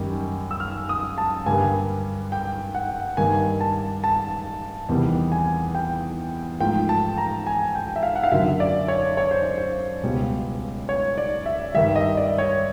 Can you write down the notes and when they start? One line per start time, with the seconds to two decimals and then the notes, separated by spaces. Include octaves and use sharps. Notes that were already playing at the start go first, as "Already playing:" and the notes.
Already playing: F#2 D#3 G3 A#3
0.51 E6
0.60 F6
0.89 D#6
1.18 A5
1.46 G2 D3 G3 A#3 G#5
2.32 G5
2.75 F#5
3.17 G2 D#3 G3 A#3 G#5
3.61 A5
4.04 A5
4.89 E2 C3 D#3 G3
5.32 G#5
5.75 G5
6.60 G#2 F3 A3 G5
6.89 A5
7.18 A#5
7.47 G#5
7.75 G5
7.96 E5
8.03 F5
8.16 F#5
8.23 F5
8.32 F#2 D3 F#3 A#3 E5
8.60 D5
8.88 C#5
9.17 C#5
9.31 C5
9.58 C5
10.03 C#2 B2 G3
10.89 C#5
11.18 D5
11.46 E5
11.74 G2 D#3 G3 E5
11.96 D#5
12.17 D5
12.38 C#5